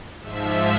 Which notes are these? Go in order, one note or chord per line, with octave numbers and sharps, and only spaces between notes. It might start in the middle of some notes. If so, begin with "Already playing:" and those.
G#2 F3 E5